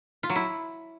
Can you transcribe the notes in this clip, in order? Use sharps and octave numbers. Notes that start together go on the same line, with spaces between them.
F4
F#3
E4